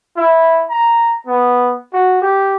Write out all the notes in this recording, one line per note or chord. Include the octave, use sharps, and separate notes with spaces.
E4
A#5
B3
F#4
G4